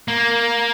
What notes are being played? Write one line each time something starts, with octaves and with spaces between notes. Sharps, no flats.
A#3